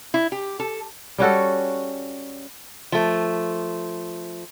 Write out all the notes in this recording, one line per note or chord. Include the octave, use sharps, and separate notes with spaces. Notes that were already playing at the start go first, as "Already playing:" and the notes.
E4
G4
A4
G3 C#4 F#4 A4
F3 A3